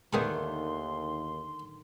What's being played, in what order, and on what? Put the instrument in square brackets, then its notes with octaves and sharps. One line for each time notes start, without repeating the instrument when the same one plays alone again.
[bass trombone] D#2 [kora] D3 D#3 A3 [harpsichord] B3 G#4 B5 [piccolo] C6